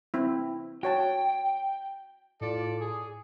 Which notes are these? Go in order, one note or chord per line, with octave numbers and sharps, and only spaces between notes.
C4 E4
F#4 C#5 G5 A5
A2 F4 A4 D5
G#4